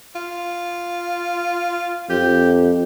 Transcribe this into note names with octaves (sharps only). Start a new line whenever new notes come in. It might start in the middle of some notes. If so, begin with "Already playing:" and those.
F4
F2 G4